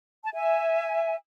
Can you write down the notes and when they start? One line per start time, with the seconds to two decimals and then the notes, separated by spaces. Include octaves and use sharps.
0.24 A5
0.33 E5 G#5